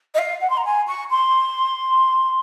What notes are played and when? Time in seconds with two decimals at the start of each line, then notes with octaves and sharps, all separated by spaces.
0.14 D#5
0.18 F5
0.41 F#5
0.50 C6
0.57 A#5
0.65 G#5
0.87 C#6
1.10 C6